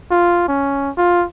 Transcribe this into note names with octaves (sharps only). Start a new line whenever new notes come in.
F4
C#4
F4